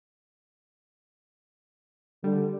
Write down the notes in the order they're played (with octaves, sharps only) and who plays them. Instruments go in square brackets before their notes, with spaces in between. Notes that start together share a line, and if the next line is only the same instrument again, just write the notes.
[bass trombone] D3 [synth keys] G3